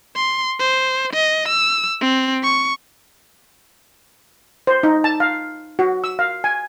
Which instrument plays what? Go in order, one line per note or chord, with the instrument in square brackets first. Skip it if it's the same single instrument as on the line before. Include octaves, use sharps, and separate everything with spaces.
[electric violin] C6
C5
D#5
E6
C4
C#6
[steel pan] C5
D#4
A5
F5
F#4
E6
F5
G#5